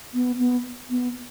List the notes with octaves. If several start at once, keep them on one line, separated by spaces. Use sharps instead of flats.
B3
B3
B3